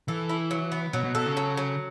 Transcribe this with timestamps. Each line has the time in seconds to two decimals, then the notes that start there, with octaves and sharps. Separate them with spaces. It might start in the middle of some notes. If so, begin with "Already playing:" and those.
0.08 E3 A4
0.29 E4
0.51 F#3
0.72 B3
0.93 B2 F#3
1.04 B2
1.15 B2 A4
1.26 C#3
1.37 F#3
1.57 F#3